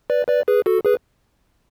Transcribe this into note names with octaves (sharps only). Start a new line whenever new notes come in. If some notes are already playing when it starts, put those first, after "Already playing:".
B4 D5
B4 D5
G#4 B4
F#4 A4
G#4 B4